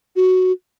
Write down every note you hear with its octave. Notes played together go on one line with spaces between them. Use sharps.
F#4